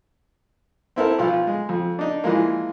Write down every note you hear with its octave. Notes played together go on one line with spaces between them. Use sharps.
C4 E4 A4 A#4
B1 F3 F4
G#3
F2
D4 D#4
E3 F3 G#3 A#3